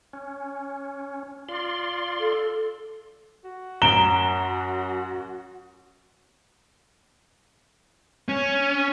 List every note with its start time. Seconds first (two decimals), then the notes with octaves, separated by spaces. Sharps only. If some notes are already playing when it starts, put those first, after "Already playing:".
0.13 C#4
1.49 F4 D5 C6
2.20 A4
3.45 F#4
3.82 F#2 A#5 D7 E7 G7
8.29 C#4